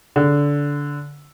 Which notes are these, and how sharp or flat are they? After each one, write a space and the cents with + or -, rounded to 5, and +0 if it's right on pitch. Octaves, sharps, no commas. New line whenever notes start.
D3 -20